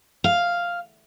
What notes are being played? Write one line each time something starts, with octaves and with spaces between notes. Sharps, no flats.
F5